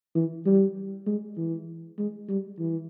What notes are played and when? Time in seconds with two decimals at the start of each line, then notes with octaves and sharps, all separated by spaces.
0.15 E3
0.46 G3
1.07 G#3
1.38 E3
1.99 G#3
2.29 G3
2.59 E3